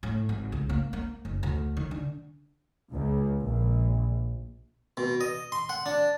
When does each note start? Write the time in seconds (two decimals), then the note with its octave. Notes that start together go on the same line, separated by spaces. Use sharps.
0.03 A2
0.29 G#1
0.52 C#2
0.69 A#3
0.93 A#3
1.25 F#1
1.43 D2
1.77 D#3
1.91 D3
2.91 C#2
3.42 A#1
4.97 B2
5.21 D#5
5.52 C6
5.69 F#5
5.86 D4